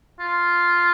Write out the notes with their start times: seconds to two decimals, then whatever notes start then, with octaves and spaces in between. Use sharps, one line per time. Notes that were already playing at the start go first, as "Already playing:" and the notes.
0.20 F4